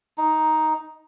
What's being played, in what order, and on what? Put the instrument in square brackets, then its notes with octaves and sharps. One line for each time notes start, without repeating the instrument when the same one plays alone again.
[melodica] D#4